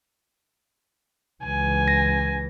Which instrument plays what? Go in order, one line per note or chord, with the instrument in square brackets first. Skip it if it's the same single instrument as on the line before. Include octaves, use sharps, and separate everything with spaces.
[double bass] C#2 E3 [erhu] G#5
[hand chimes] A#6